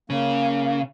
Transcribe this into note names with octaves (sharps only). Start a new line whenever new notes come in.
C#3 A#3